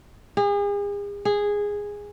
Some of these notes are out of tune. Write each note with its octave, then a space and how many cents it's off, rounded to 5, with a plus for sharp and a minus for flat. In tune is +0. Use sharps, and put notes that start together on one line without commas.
G#4 -40
G#4 -10